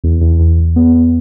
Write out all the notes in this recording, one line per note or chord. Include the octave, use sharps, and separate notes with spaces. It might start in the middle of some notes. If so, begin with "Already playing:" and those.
E2
E2
E2
E2
B3
B3